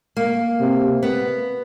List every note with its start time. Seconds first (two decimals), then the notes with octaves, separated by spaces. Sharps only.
0.17 A#3
0.60 C3
1.03 B3